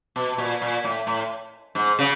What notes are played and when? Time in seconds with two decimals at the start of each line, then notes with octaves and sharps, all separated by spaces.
0.16 B2
0.38 A#2
0.61 A#2
0.84 A2
1.07 A2
1.75 G#2
1.99 C#3